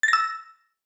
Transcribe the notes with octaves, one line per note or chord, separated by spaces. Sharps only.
E6 A6 A#6